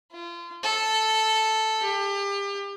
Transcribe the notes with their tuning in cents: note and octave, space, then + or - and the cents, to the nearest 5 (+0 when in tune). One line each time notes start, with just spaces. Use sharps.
F4 -30
A4 -5
G4 +30